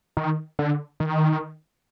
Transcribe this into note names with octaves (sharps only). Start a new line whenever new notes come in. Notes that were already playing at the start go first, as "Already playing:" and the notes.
D#3
D3
D#3